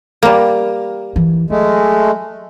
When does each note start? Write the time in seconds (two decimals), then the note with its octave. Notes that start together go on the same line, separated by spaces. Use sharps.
0.23 G3 A#3
1.16 E3
1.50 F#3 G#3 A3